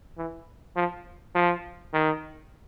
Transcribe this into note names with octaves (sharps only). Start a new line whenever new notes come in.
E3
F3
F3
D#3